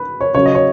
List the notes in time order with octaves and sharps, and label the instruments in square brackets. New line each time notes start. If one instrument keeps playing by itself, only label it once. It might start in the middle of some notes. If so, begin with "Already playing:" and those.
Already playing: [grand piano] B4
C#5
C#3 F#3 C#5
D#5
C#5